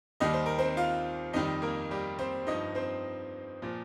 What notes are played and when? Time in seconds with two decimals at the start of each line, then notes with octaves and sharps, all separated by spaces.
0.20 D#2 D#3 G3 D#5
0.34 C5
0.46 A#4
0.59 C4 C5
0.77 F4 F5
1.33 F2 D#3 G3 D#4 D#5
1.62 A#3 A#4
1.91 G3 G4
2.19 C4 C5
2.47 G2 F3 D#4 D#5
2.75 C4 C5
3.62 A#2 F3